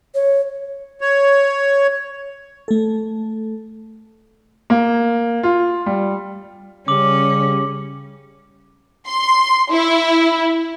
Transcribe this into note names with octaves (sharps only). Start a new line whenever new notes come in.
C#5
C#5
A3 A4
A#3
F4
G3
C#3 G3 C#4 D6 F#7
C6
E4